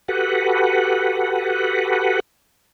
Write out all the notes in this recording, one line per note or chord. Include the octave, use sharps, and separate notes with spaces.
F#4 G4 A4 B4 F#5